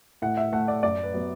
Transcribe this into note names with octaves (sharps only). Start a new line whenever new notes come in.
A2 F#5
E5
A3 F#5
D5
F#2 D5
B4
F#3 B3